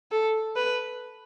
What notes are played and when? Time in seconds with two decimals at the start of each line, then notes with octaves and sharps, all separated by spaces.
0.12 A4
0.56 B4